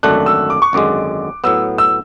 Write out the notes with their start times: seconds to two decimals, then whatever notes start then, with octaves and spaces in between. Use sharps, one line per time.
0.03 G#1 F#2 D3 A3 D4 F#6
0.26 E6
0.50 D6
0.62 C#6
0.73 G#1 F#2 D3 G#3 D6
1.44 A2 F#3 B3 E6
1.78 E6